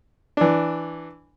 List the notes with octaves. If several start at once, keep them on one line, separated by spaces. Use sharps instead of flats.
E3 D4